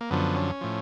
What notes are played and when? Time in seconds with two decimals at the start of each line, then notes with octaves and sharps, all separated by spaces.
0.01 A#3
0.11 F#2 D3 F3 B3
0.36 C#4
0.61 A2 F3